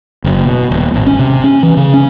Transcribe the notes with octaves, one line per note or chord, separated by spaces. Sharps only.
F#1
B2
D#1
G#1
C#4
C3
C#4
E3
C#3
C#4